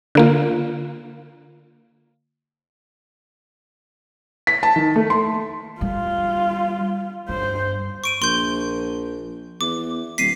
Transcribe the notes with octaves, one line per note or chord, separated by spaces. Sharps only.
D3 A#3 F4
B6
A5
D#3
A3
C6
G3 F4
G2 C5
C#6 D7 D#7
A#1 C6 G6
E2 D6
D1 B6 C7 D#7